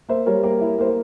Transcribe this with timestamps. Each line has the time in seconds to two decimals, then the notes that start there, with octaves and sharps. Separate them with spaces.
0.09 A#3 C5 E5
0.26 G3 A#4 C#5
0.43 A#3 G4 A#4
0.61 E4
0.78 A#3 C5
0.87 A#4